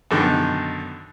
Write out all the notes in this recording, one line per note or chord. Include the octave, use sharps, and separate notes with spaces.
F#2 B2 D3 D#3